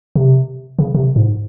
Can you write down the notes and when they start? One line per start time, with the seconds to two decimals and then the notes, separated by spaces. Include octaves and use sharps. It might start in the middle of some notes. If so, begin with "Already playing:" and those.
0.16 C3
0.79 C#3
0.95 C3
1.16 G#2